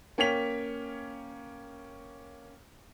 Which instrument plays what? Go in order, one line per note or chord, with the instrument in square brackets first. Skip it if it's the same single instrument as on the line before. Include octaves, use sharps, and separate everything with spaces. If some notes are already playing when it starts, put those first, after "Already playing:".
[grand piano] A#3 C#4 C#5 G5 B6 F7